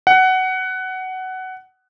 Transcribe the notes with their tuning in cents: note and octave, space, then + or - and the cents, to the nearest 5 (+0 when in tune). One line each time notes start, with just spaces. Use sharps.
F#5 +15